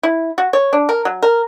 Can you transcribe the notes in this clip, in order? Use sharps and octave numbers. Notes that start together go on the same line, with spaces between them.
E4
F#4
C#5
D4
A#4
F#3
A#4